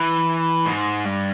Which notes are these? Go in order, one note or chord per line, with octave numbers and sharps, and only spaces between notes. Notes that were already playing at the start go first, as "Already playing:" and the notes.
Already playing: E3
G#2
G2